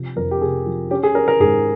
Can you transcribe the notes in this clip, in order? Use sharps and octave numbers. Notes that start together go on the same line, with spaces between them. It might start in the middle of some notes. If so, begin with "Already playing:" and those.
Already playing: C3 F3
F2 A#4
G4
C3 G#4
F3
C#4 G4
G#4
C#4 A#4
A#4
G#2 G#4